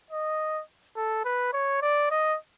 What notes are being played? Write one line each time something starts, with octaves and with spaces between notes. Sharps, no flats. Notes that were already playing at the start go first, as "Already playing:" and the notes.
D#5
A4
B4
C#5
D5
D#5